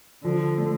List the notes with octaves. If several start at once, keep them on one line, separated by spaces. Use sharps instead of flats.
D3 F3
A3